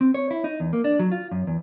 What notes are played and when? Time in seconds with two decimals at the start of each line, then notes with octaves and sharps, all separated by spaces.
0.01 C4
0.14 C#5
0.31 E4
0.44 D#4
0.60 E2
0.73 A#3
0.84 D4
0.99 F#3
1.12 F4
1.31 F#2
1.47 E2